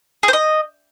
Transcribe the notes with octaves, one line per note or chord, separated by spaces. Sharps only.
G#4
C5
D#5